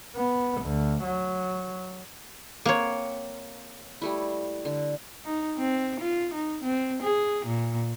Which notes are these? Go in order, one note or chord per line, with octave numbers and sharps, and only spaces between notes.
B3
D2
F#3
A#3 C4 C#5 F#5
G3 A3 E4
D3
D#4
C4
F4
D#4
C4
G#4
A#2